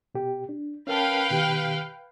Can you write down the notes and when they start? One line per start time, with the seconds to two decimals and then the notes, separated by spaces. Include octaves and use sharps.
0.15 B2 G4
0.49 D4
0.87 C#4 A#4 B4 F5 G5 A5
1.30 B2 D#3 G4